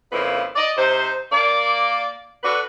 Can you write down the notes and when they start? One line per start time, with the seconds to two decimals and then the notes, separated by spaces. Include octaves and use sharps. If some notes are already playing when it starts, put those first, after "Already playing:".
0.12 F2 C#3 A#3 E4 B4
0.56 D5 D#5
0.76 C3 D#4 C5
1.32 A#3 D5
2.44 D4 F#4 A4 B4